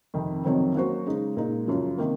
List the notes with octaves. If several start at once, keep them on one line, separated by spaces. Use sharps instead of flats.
F2 C3 D#3
F2 C3 D#3 F#3 C4
F#3 A#3 C#4 F#4 C5
C#3 G#3 D#4
A#2 G#3 D#4
F#2 C#3 F3
C3 D#3 A#3